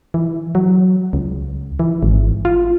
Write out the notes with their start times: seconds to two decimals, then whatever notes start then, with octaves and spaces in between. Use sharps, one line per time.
0.14 E3
0.55 F#3
1.13 C#2
1.79 E3
2.03 G#1
2.45 F4